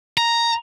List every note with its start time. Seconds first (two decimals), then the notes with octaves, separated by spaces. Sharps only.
0.17 A#5